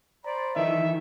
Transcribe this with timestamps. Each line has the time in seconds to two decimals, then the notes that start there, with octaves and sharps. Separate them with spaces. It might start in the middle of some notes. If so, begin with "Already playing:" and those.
0.24 C5 D5 A#5 B5
0.56 D#3 E3 A4 D#5 E5